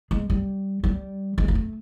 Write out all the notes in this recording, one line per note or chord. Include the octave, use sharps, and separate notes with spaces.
G#3
G3
G3
G#3
A#3
A3